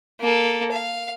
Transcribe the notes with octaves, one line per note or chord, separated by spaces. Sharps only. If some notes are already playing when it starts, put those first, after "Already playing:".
A#3 A4
F5